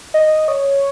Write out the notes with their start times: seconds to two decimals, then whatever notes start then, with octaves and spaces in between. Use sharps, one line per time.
0.14 D#5
0.48 C#5